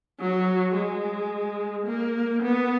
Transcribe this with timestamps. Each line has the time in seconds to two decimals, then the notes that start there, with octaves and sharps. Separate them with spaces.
0.20 F#3
0.75 G#3
1.86 A#3
2.43 B3